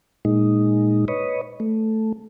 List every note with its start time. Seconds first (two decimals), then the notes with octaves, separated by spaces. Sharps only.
0.25 A#2 G#3 D#4
1.08 B4 C#5 D#5
1.60 A3